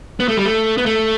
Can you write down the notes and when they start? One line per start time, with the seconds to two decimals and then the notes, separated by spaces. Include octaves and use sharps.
0.20 B3
0.28 A3
0.37 G3
0.45 A3
0.78 B3
0.86 A3